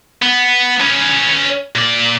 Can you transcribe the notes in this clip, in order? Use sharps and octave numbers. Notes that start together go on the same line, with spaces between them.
B3
C#4 B4
A#2 D5